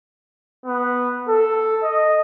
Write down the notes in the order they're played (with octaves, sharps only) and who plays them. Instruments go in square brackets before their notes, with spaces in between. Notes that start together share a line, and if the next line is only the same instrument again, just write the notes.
[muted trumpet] B3
A4
D#5